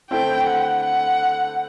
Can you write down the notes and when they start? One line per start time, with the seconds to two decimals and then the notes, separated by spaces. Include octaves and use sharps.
0.11 D3 A3 C4 E4 G5
0.47 F#5
0.83 F#5